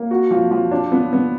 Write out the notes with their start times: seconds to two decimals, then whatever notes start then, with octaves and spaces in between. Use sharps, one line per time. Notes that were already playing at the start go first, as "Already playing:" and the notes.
Already playing: A#3
0.11 F#4
0.31 F3
0.51 F3
0.71 D4
0.92 B3
1.13 B3